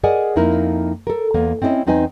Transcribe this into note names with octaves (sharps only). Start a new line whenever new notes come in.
G#4 A#4 D5 D#5 F#5 G#5
F2 A#3 D#4 E4 A#4
A4 A#4
E2 A#3 B3
C4 C#4 E4 D5 D#5
E2 C4 D#4 B4 D#5 G#5